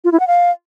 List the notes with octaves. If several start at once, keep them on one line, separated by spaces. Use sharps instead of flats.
F4
E4
F#5
F5